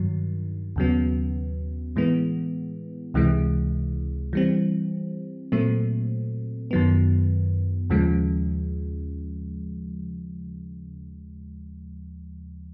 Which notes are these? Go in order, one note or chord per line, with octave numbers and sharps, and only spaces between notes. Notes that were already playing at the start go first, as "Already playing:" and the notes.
Already playing: G2 D#3 F#3
D#2 C#3 F#3 B3
A2 E3 G#3 B3
C#2 C3 E3 G#3
E3 G3 C4
A#2 F#3 A3 C4
F#2 D#3 F#3 B3
D#2 C#3 F3 G#3